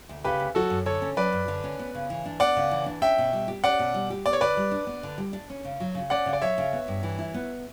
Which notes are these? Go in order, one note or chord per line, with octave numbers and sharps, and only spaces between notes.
D2
C#3 G4 B4
D2
F#3 F#4 A4
F#2
D3 A4 C#5
C#4
F#3 B4 D5
F#2
D3
C#4
B3
C#3
E3
D4
B3 D5 F#5
C#3
E3
D4
C#4 E5 G5
B2
G3
G4
C#4 D5 F#5
B2
G3
G4
B3 D5
C#5
D3 B4 D5
G3
D4
B3
D3
G3
D4
C#4
C#3
F#3
C#3
C#4 D5 F#5
C#3
D5
F#3 C#5 E5
C#3
B3
G2
E3
E4
B3